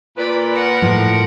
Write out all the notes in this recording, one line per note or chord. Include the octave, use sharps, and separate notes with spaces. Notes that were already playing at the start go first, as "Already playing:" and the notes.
A#2 B4 D5 B5
A#4 F#5
A2 F3